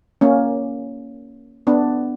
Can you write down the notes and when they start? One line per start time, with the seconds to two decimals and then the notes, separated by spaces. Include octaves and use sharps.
0.21 A#3 C#4
1.67 B3 D4